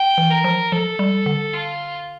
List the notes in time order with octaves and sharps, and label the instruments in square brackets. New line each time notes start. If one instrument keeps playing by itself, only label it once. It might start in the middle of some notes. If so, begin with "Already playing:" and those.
Already playing: [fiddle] G5
[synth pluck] E3
[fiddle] A#4
[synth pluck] F3
[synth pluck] F3 [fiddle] A4
[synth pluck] G3
D3
[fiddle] F4